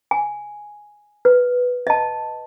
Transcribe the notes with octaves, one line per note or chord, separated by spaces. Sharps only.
G#5
B4
D#5 A5